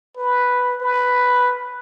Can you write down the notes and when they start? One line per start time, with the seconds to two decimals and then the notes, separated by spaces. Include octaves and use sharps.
0.17 B4
0.81 B4